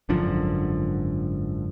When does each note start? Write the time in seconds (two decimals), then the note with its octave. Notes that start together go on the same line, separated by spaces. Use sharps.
0.09 G#1 F#2 D3 F3